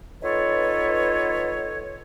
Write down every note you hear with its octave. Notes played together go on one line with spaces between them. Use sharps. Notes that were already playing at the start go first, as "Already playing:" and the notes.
B3 D#4 F4 A4 B4 C#5